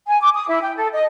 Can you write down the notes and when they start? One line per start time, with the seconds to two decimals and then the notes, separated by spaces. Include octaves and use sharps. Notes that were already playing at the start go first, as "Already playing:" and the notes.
0.08 G#5
0.20 D6
0.34 D#6
0.48 E4
0.62 G5
0.76 A4
0.93 D#5